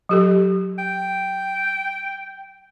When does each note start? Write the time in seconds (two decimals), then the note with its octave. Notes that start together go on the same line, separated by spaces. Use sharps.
0.09 F#3 G4 A4
0.79 G5